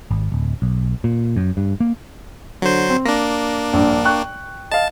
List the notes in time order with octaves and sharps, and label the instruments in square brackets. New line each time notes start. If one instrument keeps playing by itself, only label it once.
[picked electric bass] G#1
D1
B1
A#2
F#2
G2
A#3
[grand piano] D3 [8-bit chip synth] F#3 C5
[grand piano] C4
[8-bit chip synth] A#3 D4 [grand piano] A#6
[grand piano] A#1 G2
G5 C#6 F#6
[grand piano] D#5 F5 [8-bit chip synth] A5